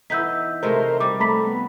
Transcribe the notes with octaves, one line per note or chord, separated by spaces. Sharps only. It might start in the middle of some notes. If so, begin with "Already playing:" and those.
E3 B3 D#4 E6 G6 B6
C3 G#3 A3 A#4 C5
G3 D6
A3 A#5 B5 B6
B3